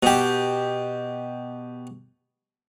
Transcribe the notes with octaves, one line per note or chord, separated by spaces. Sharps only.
B2 G4